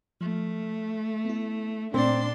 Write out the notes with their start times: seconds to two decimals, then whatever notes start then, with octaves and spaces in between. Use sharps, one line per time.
0.21 F3 A3
1.25 B3 E4
1.94 A#2 A3 C4 D4 D5 C6